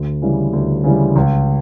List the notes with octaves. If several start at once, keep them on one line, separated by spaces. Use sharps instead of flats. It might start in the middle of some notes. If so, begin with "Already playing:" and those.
Already playing: D2
C#3 E3 G3
D2
C#3 E3 G3
C#2